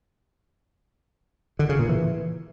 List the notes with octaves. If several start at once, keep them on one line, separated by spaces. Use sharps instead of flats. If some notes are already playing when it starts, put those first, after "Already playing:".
D3
C#3
A#2
E3